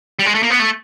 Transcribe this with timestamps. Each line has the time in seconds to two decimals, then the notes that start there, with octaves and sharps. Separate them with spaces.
0.19 G3
0.26 G#3
0.35 A3
0.43 A#3
0.50 B3
0.59 A3